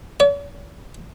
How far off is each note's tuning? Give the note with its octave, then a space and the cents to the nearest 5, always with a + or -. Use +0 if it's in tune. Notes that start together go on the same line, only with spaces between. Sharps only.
C#5 +45